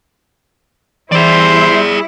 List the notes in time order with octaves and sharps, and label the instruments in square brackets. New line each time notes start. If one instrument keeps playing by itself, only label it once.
[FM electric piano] E3 [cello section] G3 E4 [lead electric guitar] G#4 D5 [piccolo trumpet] C5